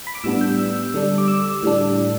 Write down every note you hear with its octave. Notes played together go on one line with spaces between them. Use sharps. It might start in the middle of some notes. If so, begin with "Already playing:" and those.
B5
D6
A2 G3 B3 D4 E6
G6
E6
D3 G3 D4
D6
E6
A2 G3 D4